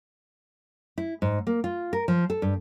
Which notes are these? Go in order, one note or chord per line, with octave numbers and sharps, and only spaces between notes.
E4
G#2
A#3
F4
A#4
F3
A4
G2